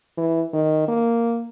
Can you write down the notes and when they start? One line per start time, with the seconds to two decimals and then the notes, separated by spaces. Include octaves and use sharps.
0.18 E3
0.53 D#3
0.88 A#3